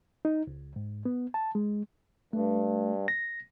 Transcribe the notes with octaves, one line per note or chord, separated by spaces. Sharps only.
D#4
C#2
G#2
B3
A5
G#3
G2 A3
A#6